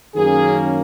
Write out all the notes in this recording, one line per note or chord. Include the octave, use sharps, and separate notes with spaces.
F#2 D#3 A#3 C#4 G#4